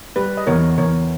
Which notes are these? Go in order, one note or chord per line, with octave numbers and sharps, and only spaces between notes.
G3 B4
D#5
E2 A#4 C#5
E2 A#4 C#5